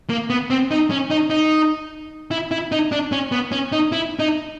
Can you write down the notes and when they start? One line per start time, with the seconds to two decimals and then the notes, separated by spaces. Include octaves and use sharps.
0.10 A#3
0.30 B3
0.50 C4
0.71 D#4
0.91 C#4
1.10 D#4
1.30 D#4
2.31 E4
2.51 E4
2.72 D#4
2.92 D4
3.12 C#4
3.32 B3
3.52 C#4
3.72 D#4
3.92 E4
4.19 D#4